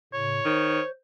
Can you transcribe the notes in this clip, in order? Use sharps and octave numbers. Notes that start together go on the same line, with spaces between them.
A2 C#3 C#5
D#3 C5